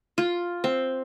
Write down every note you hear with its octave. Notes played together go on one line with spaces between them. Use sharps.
F4
C4